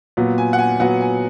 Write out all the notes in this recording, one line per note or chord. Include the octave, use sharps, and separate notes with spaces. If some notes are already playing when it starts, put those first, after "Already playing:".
A#2 F#3 B3
G#5
F#5
G#5
A#2 F#3 B3 F#5
G#5